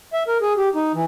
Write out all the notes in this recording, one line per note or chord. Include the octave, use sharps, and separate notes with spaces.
E5
A#4
G#4
G4
D#4
E3